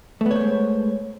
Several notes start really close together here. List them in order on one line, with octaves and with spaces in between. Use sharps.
A3 B3 C#5 C5 G#3